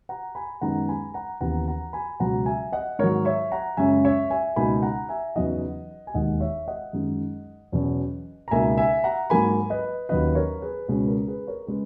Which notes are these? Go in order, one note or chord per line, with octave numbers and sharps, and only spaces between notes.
F#5 A#5
G#5 B5
F#2 D#3 G#3 B3 D#4 F#5 A#5
G#5 B5
F#5 A#5
D#2 C#3 E3 B3 F#5 A#5
F#5 A#5
G#5 B5
C#2 B2 F#3 F#5 A#5
E5 G#5
D#5 F#5
G#2 D#3 F#3 A#4 C#5
C#5 E5
F#5 A#5
F#2 C#3 G#3 C#4 E5 G#5
C#5 E5
E5 G#5
C#2 B2 A#3 D#4 G#5 B5
F#5 A#5
E5 G#5
E2 C#3 F#3 B3 D#4 D#5 F#5
G#5
E1 D#2 D#3 G#3 D#5 F#5
C#5 E5
D#5 F#5
F#2 D#3 G#3 D#4
E2 B2 F#3 C#4
A#5
C#2 B2 A#3 D#4 E5 G#5
E5 G#5
F#5 A#5
G#2 F#3 A#3 G#5 B5
B4 D#5
D#2 D#3 F#3 C#4 B4 D#5
A#4 C#5
G#4 B4
C#2 B2 G#3 C#4 G#4 B4
A#4
G#4 B4
A#4 C#5
C#3 G#3 G#4 B4